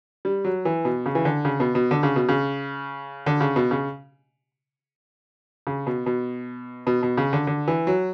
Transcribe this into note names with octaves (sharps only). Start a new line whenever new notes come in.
G3
F#3
E3
B2
C#3
E3
D3
C#3
B2
B2
D3
C#3
B2
C#3
D3
C#3
B2
C#3
C#3
B2
B2
B2
B2
C#3
D3
D3
E3
F#3